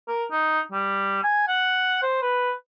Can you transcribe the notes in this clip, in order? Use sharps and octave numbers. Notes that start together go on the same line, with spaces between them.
A#4
D#4
G3
G#5
F#5
C5
B4